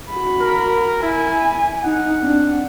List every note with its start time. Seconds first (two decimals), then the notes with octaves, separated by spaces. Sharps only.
0.11 F#4 B5
0.42 A#4
1.03 E4 G#5
1.84 D#4 F#5
2.21 C4 D4